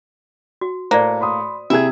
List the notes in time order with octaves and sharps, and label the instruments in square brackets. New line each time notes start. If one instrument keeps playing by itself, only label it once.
[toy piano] F#4
[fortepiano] A2 [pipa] A#3 [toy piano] C5 D5
[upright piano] B5 C6 D#6
[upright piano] C3 G#6 [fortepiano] E4 G#4 [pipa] E5